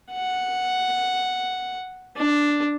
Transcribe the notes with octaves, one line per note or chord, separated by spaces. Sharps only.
F#5
D4